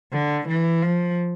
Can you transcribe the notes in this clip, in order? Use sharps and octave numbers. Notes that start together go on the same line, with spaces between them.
D3
E3
F3